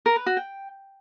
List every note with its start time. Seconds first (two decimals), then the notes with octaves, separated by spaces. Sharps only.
0.06 A#4
0.16 B4
0.26 F#4
0.37 G5